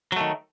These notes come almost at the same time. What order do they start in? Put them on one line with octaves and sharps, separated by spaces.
F#3 A3 D#3